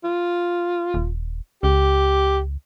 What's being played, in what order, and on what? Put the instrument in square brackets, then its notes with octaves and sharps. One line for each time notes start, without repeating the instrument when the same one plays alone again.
[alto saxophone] F4
[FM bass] D#1
[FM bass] C#2 [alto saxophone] G4